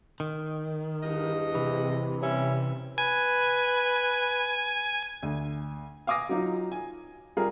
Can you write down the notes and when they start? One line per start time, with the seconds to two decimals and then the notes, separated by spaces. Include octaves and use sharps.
0.20 D#3
1.03 E2 G2 D#5
1.55 C3 E3
2.22 G3 C#4 E5
2.98 B4 G#5
5.23 D2
6.07 F5 G#5 D6 D#6 A#6
6.29 F#3 D#4 F4
6.72 G#5
7.37 G3 F4 G#4 A#4